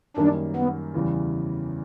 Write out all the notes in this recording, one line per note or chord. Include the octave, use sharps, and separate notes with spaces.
F#2 D#3 G3 A#3 D4
B3
E2 C#3 E3 G3